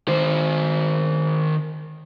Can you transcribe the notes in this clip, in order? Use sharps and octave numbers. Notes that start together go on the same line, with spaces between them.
D#3 C5